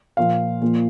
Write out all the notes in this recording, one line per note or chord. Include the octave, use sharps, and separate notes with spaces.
A#2 F3 A#3 F5
A#2 F3 A#3